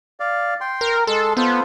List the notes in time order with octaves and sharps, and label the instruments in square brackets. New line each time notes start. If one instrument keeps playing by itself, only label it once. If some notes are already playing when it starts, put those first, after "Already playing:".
[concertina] D5 F5
G5 C6
[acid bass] A#4
[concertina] G#3 C6 [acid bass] A4
[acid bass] B3 [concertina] F4 A4 C5